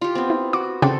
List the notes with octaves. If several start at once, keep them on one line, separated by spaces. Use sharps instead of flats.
F4 G4
B3 C4
E4
F#4 D6
C#3 C4 D4 A4 G5